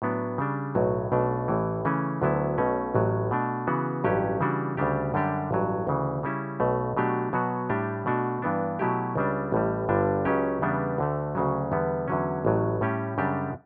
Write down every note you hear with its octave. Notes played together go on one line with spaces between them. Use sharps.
A2 F#3 B3 D4
C#3 G3 D4
B1 A2 F#3
B1 B2 A3 D4
A1 A2 E3
C#3 E3 A3 C#4
D2 D3 F#3 B3 E4
B1 B2 A3 C#4
A1 A2 F#3
B2 A3 D4
C#3 E3 B3 F#4
A1 G2 F#3 C#4 G4
C#3 E3 G3 D4 F#4
D2 C#3 G3 D4 G4
F#2 D3 G3 D4 G4
A1 G2 F#3
D2 C#3 E3
C#3 G3 C#4 E4
B1 B2 A3
B2 F#3 A3 D4 G4
B2 F#3 B3 F#4
A2 G3 D4 G4
B2 A3 D4 F#4
G2 E3 B3 D4
B2 F#3 A3 E4 G4
C#2 C#3 G3 D4
A1 A2 G3
G1 G2 D3 G3 D4
C#2 C#3 F#3 C#4 G4
E2 C#3 G3 B3 D4
D2 D3 A3
D2 C#3 F#3
E2 D3 G3 B3
E2 D3 F#3 C#4
A1 A2 F#3
A2 G3 C#4 G4
F#2 C#3 G3 D4 G4